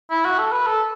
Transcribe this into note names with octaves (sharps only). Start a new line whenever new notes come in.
E4
F#4
A4
B4
A4